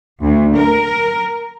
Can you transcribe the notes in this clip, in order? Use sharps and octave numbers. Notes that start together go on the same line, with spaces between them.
D2
A#4